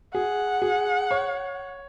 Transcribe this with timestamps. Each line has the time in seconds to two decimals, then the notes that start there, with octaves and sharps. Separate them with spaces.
0.14 G#4 F#5
0.62 G#4
1.11 C#5